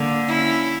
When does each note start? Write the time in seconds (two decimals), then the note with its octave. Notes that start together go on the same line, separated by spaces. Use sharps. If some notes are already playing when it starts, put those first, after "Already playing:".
Already playing: D3 A#3
0.27 C#4 E4